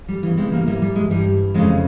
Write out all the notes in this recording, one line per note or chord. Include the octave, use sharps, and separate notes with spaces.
G3
E2 C#3 E3
G#3 C4
G3 A#3
G#2 E3 G3 A#3
G3
G#3
G2 E3 G3
F2 C#3 E3 G#3